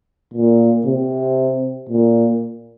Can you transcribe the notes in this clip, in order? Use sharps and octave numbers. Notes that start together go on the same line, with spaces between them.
A#2
C3
A#2